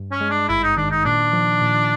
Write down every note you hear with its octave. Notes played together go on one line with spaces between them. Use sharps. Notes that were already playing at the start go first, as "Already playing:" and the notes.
Already playing: G2
C#4
G#3
D4
G#1 E4
D#4
D#3 D4
D#4
A#2 D4
F3
A#2